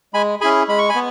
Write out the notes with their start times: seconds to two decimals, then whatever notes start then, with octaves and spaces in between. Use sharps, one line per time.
0.14 G#3 G#5 B5
0.41 C#4 E4 G#4 G#5 B5
0.68 G#3 B5
0.78 C#6
0.89 G#5 B5
0.95 B3